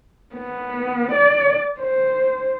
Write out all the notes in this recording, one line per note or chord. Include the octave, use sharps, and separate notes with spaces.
B3
D5
C5